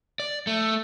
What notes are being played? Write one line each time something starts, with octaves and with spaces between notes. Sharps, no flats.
D5
A3